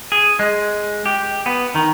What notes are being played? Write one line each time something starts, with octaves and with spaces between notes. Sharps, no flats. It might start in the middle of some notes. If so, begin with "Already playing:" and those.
G#4
G#3
G4
B3
D#3